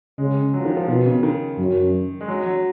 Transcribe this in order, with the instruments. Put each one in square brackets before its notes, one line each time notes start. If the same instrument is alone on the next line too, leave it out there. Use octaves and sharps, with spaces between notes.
[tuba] C#3 [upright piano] G#3
[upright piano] F#3
F3
D#3
F3
[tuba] B2 [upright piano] D#3
[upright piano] C#3
D#3
[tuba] F#2
[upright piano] G#3
F#3
F#3